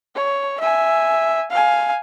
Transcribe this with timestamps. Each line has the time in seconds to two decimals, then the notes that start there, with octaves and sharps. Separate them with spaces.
0.15 C#5
0.60 E5 G#5
1.50 F5 G#5